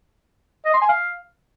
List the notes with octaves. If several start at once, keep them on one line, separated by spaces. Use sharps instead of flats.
D#5
C6
G#5
F5